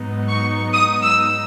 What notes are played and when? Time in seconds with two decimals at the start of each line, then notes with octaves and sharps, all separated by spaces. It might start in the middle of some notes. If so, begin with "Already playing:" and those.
Already playing: G#2 F#3 B3 D#4
0.28 C#6
0.74 D#6
1.04 E6